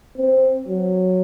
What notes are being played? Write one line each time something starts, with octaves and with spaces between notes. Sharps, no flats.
C4
F#3